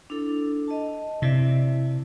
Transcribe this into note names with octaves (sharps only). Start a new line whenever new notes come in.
D4 E4 A4
D#5 A5
C3 E4 D5 E5